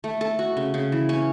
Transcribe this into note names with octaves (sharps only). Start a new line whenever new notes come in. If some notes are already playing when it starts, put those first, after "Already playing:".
A3
A4
F#4
C#3
C#3
E3
C#4